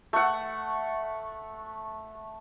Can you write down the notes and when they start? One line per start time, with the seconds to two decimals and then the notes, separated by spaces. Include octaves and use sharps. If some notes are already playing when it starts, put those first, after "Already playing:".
0.13 A3 F#5